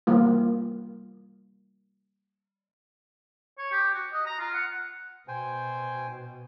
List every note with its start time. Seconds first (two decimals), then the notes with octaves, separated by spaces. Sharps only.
0.07 E3 G3 A#3 F4
3.58 C#5
3.72 G4
3.94 F#4
4.13 D#5
4.26 A#5
4.40 F4
4.54 F#5
5.28 B2 C5 G5 G#5